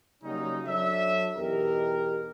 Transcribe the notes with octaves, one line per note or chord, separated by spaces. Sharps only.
C#3 F#3 G3 A#3 C#4 D#4
F#3 D4 A4 C#5 E5
E2 B2 D#4 G4 A#4